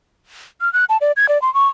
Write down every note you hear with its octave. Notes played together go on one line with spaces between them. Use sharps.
F6
F#6
A5
D5
G#6
D5
C6
C#6